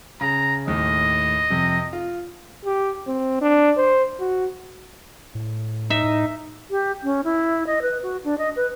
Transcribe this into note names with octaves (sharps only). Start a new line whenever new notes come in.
C#3 A#5
D#2 A2 D#5
F2 C3
F4
G4
C4
D4
C5
F#4
A2
D#4 E5
A2
G4
C#4
E4
D#5
B4
F#4
D4
D#5
B4